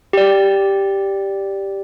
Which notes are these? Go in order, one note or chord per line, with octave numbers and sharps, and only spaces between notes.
G4 D5